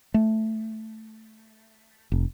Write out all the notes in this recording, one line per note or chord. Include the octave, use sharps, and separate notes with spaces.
A3
F1